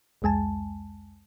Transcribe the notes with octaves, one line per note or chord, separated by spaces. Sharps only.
C2 F2 G#3 G#5 A5